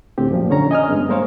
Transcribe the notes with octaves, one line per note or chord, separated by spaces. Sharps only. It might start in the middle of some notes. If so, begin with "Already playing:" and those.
D2 A2 C4 G4
F#2 A#2 F3
D3 C#4 C#5 A#5
D#5 G#5 D#6 F6
G2 G#3 B3
A#3 A#4 C5 C#5 F5